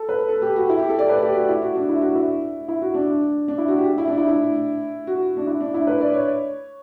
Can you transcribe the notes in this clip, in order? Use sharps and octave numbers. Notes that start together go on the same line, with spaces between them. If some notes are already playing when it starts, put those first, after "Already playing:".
Already playing: A4
B4
A4
G4
F#4
E4
G4
A4
D5
B4
G4
F#4
E4
F#4
D4
E4
F#4
E4
E4
F#4
D4
D4
E4
F#4
G4
E4
D4
E4
E4
F#4
D4
E4
D4
E4
B4
D5
C#5